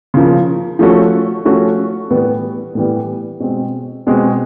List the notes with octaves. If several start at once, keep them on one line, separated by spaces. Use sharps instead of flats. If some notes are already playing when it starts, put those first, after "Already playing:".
C#3 F3 A#3
F3 A3 C#4 F#4 A4
F3 A3 C#4 F#4 A4
A2 E3 G3 B3
A2 E3 G3 B3
B2 G#3 C4
B2 G#3 C4